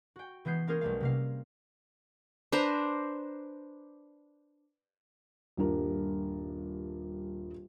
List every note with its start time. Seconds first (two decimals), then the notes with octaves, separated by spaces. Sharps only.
0.16 F#4 G5
0.45 E3 G#3 B3 G6 C7
0.67 A#3 C#4 F4 G#4 A#4 C5
0.81 B1 G3 A3 F5
1.01 C3 A#3 F5
2.52 D4 B4 C5 A#5
5.57 D#1 G2 D4 A#4